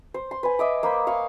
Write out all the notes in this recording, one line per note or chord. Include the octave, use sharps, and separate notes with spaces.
C5
C6
B4 G#5
D#5 E5 D6
A#3 C5 B5
F5 C#6